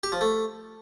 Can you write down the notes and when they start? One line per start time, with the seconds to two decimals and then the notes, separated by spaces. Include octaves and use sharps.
0.03 G4
0.12 F3
0.21 A3